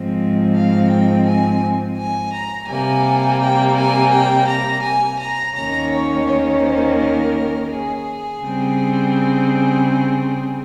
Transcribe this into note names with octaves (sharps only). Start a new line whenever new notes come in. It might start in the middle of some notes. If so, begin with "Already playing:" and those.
Already playing: G#2 F3 G#3 C4
F5
G5
G#5
G#5
A#5
C3 G3 A#3 G#5
G5
G#5
G5
A#5
G#5
A#5
D#2 D#3 A#3 C#4 A#5
C#5
C#5
C5
A#4
G#4
C#3 G3 C4